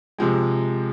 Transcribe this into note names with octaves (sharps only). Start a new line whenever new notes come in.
C3 F3 G#3